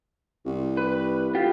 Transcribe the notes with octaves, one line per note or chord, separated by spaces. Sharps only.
C2
B4
F4 G4